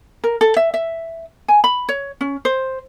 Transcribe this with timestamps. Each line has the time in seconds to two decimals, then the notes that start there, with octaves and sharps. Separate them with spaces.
0.24 A#4
0.41 A4
0.57 E5
0.74 E5
1.48 G#5
1.64 B5
1.89 C#5
2.21 C#4
2.45 C5